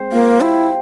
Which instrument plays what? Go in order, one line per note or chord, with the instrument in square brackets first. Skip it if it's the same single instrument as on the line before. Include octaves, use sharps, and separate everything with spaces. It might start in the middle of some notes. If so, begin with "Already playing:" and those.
Already playing: [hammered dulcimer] G#3 C4 C5
[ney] A#3 [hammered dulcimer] F4
[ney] E4 [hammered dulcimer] G4